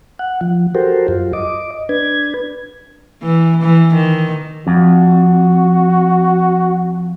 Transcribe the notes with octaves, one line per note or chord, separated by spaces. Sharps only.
F#5
F3
F#4 G4 A4 A#4 C5
F#2 F4
D#5 D6
D4 B4 G#6
E3
E3
D#3
F2 F#4